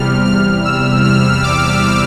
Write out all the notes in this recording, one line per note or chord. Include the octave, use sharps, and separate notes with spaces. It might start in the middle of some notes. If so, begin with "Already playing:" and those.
Already playing: E2 C3 G3 F6
F6
E6
F6
D6